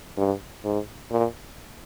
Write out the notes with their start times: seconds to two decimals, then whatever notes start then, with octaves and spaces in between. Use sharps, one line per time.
0.18 G2
0.64 G#2
1.11 A#2